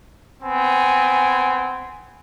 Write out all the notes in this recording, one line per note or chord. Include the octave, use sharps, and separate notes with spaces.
B3 C4 G#5